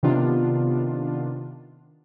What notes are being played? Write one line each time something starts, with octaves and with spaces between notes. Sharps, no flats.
C3 D#3 B3 D4 F4